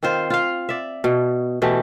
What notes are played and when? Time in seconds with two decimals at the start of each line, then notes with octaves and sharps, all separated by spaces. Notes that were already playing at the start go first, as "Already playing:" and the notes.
0.03 D#3 C4 F4 C5
0.30 F4 F5
0.69 D5 E5
1.04 B2
1.62 B2 E3 A3 G4